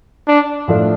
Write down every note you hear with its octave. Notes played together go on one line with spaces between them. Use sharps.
D4
A2 F3 A3 D4 F4